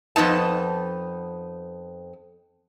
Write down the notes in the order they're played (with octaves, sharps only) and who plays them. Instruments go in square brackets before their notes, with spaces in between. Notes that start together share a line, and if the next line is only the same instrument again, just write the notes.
[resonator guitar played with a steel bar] F2 C3 B3 D#4 A5